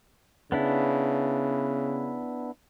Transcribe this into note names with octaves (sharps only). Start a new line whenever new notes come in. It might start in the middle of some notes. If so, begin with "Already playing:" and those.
C#3 B3 D4 E4